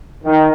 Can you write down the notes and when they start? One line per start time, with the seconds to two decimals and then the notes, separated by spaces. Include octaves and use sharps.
0.24 D#3